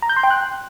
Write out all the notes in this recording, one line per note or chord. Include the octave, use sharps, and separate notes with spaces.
A#5
G6
C6
G5
F#6